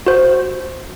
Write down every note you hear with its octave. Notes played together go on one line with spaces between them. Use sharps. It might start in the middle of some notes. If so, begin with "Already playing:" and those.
F#4 C5